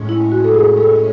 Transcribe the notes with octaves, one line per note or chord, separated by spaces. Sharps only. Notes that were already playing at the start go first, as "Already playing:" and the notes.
Already playing: A2 G#3 C#4
E4
F#4
A4
G#4
A4